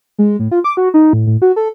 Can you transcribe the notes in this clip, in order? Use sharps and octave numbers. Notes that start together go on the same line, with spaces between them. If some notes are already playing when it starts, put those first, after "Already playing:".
G#3
A2
F4
D6
F#4
D#4
A2
A2
F#4
A4